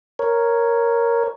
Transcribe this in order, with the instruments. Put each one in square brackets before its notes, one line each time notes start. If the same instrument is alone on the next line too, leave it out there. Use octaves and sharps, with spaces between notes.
[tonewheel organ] A#4 C#5